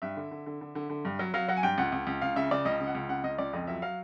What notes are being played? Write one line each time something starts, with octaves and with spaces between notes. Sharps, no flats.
G2 E5
D3
D3
D3
D3
D3
D3
G2
F#3
F#3 F5
F#3 F#5
G#5
G2 G5
C#2 F#5
C#2
C#2
C#2 F5
C#3 E5
C#3 D5
C#2 D#5
C#3
F#5
C#2
C#3 F#5
C#2 D#5
C#2 D5
F2 D#5
F#3 E5
F#3 F5